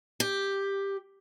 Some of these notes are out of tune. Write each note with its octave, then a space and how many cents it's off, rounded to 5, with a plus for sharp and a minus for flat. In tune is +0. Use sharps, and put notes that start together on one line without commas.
G4 +5